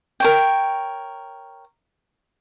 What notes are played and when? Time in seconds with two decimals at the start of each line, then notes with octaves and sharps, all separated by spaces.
0.20 A#4 C#5 G5